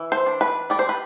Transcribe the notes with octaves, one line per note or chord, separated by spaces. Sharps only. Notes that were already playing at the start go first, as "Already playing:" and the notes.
Already playing: E3
C5
D4
B4
G3 D5
C5
B4